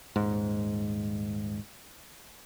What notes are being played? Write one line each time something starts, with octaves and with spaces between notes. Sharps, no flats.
D#1 G#2